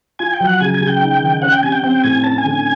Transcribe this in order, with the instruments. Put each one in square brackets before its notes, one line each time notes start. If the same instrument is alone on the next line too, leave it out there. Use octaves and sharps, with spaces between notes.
[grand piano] F4 [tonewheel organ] G#5
[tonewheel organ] G5
[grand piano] F#3
[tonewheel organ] F#5
[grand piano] C#3 [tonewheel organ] G#5
[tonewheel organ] G#5
[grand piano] C#3
[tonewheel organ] G5
[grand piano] D#4
D#3
[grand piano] C#4 [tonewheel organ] F#5
[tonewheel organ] G5
[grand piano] C3 [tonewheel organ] G#5
[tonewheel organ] G5
[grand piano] C4 [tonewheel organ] G5
[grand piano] A2 [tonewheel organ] G#5
[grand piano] C#4 [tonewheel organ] A5
[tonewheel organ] G#5
[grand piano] D3
[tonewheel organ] G#5